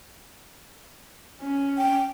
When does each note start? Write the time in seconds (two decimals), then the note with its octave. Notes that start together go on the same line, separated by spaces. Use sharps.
1.41 C#4
1.78 G5